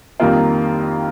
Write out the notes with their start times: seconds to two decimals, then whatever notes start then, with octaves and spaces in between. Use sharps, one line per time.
0.20 F2 D#3 G3 A#3 F4